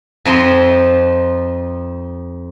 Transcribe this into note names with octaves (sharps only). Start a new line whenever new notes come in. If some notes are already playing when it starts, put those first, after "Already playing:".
F2 F3 D#4 C6